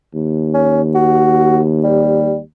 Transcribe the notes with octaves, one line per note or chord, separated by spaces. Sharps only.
D#2
C#4
F#4
G3